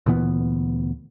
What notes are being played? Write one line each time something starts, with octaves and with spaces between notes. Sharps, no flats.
D2 A#2 E3 B3